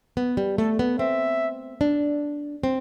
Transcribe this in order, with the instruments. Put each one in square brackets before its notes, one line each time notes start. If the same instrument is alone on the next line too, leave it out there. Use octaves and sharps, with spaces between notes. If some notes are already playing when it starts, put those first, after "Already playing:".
[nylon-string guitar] B3
G3
[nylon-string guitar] A3 [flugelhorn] A4
[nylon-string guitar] B3
[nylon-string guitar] C4 [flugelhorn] E5
[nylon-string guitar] D4
C4